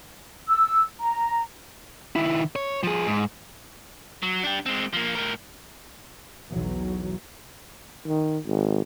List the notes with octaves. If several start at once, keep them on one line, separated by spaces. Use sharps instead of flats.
E6
A#5
D#3 E4
C#5
F3 G#4
G#2
F#3
D4 G4
G#3 C4
F3 A#3
A2 A#4
B1 E2 E3 F#3
D#3
G#1